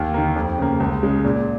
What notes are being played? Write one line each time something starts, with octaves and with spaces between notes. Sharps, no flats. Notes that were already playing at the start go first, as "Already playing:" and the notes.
Already playing: D#2
D#3 A#3
F2
C#3 A#3
C#2
C#3 G#3
A#2